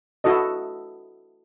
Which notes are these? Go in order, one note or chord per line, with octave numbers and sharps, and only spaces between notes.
E4 F#4 A4 D#5